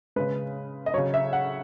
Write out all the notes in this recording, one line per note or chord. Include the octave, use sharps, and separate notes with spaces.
C#3 G#3 B4
D#5
C#3 F#3 C#5
E5
F#5